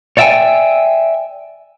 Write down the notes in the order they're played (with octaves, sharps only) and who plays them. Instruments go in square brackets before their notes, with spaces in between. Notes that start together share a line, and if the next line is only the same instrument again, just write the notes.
[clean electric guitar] C#5 D5 E5 F5 G5 G#5